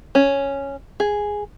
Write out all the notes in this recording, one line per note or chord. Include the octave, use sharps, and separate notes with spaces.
C#4
G#4